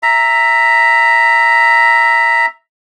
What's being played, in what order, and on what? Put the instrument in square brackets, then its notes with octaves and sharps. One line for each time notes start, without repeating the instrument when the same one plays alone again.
[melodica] E5 A#5